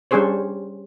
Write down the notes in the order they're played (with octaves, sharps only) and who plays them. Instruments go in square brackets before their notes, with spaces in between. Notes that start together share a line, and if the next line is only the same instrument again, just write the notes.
[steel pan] G3 C#4 D4 G#4 C5 C#5